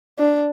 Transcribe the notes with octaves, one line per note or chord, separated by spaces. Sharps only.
D4